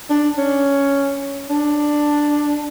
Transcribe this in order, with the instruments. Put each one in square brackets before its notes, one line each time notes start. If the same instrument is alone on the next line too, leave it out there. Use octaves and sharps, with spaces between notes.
[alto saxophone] D4
C#4
D4